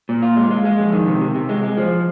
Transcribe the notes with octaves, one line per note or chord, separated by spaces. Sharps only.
A#2
F4
G#3
G#3
G#3
F2
D#3
C3
C3
C3
G#3
G#3
F3